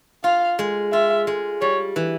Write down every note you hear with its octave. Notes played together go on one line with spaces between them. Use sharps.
F4 F5
G#3
F4 E5
G#3
G3 C#5
E3